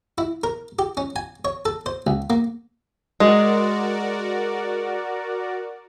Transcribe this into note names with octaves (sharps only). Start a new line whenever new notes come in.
E4
A#4
G4
C#4
G#5
C#5
A4
C5
C#2
A#3
G#3 F#4 A#4 D5